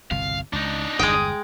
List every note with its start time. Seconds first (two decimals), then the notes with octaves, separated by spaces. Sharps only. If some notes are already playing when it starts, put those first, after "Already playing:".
0.11 G1 C2 B2 F5
0.53 C#2 D4 D#4
0.99 G1 E2 G#3 G5 D#6